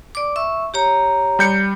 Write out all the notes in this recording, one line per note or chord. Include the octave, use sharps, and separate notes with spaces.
D5 D6
E5 C#6 E6
G4 C#5 A#5
G3 G6 C#7